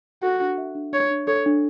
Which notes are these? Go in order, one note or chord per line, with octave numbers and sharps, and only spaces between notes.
F#4 A4
D4
E5
D4
D4 C#5
D4
A4 C#5
D4